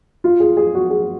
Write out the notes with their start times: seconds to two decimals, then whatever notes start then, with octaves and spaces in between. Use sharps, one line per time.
0.24 F4
0.40 G#4
0.57 G#4
0.75 F#4
0.90 G#4